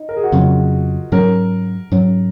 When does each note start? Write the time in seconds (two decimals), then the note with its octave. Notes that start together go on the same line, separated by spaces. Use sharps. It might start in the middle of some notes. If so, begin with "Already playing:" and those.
Already playing: D#4
0.09 A#4
0.17 G#4
0.24 F#4
0.32 F2 C#3 F#3 C#4 F4
1.12 G#2 F#3 C#4 A#4
1.92 G#2 F#3 C#4